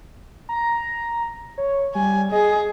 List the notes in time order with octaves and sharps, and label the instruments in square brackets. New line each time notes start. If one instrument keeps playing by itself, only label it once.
[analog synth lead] A#5
C#5
[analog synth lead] G3 [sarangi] G#5
[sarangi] G#4 [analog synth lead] D#5